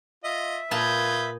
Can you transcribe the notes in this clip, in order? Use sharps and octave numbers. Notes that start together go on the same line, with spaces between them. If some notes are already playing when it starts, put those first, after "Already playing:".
F4 D#5 E5
A#2 F4 B4 A5 D#6 G6 G#6